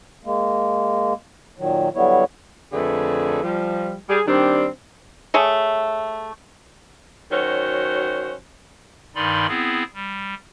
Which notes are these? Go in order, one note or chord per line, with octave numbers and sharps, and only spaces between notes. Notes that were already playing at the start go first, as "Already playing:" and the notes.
G#3 A#3
A#2 D#3 F#3
D3 F#3 G3 B3 E4 C#5
F2 D3 A3 G#4 B4
F3 G3
G3 G#4
D#3 G3 C4 D4
A3 G#4 C#5
D#3 F#3 C#4 F#4 C5
G2 D#3 D#4 D5 B5 C6
B3 C4 E4 G#4
G3